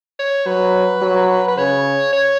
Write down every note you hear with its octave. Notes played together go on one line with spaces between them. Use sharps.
C#5
F#3 B4
F#3
B4
C#3 C#5
C#5